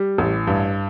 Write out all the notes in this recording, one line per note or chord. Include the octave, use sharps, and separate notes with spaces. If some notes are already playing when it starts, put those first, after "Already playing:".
Already playing: G3
A1
G2